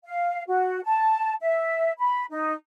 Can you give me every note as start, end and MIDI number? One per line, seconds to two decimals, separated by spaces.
0.05 0.43 77
0.48 0.81 66
0.84 1.33 81
1.42 1.92 76
1.98 2.25 83
2.30 2.53 63